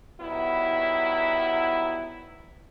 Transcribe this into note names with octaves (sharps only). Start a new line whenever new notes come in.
D#3 F#3 G3 B3 E4